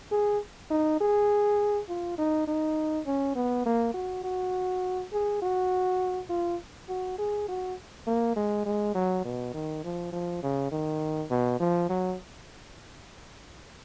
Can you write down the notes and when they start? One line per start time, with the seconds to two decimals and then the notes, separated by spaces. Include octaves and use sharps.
0.12 G#4
0.71 D#4
1.01 G#4
1.89 F4
2.18 D#4
2.47 D#4
3.06 C#4
3.36 B3
3.66 A#3
3.94 F#4
4.24 F#4
5.13 G#4
5.42 F#4
6.30 F4
6.89 F#4
7.18 G#4
7.48 F#4
8.07 A#3
8.36 G#3
8.66 G#3
8.95 F#3
9.25 B2
9.54 D#3
9.84 F3
10.13 F3
10.43 C#3
10.72 D#3
11.30 B2
11.60 F3
11.89 F#3